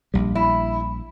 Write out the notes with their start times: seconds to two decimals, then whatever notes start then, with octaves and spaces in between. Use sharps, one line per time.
0.14 A#1 G3
0.35 E4